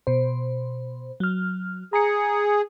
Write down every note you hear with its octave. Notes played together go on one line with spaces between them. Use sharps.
B2 C5
F#3 F6
G#4 A#5 C#7